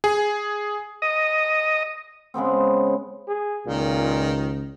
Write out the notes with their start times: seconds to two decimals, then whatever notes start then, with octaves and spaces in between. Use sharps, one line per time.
0.04 G#4
1.02 D#5
2.34 C#3 G#3 B3 C4
3.28 G#4
3.67 C#2 A#2 D#3